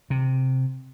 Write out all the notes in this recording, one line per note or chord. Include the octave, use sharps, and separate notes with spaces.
C3